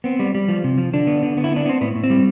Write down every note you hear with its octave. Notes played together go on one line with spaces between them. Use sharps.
B3 C4
G3
G3
F3
C3
F3
D3 D4
B3
D3
B3
E4
B3 D4
B3 C4
A2 B3
A2
C4
G3